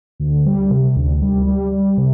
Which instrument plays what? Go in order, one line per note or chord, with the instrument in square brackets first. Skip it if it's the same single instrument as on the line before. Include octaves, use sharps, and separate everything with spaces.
[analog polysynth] D2
G3
C3
D2
G3
G3
G3
C3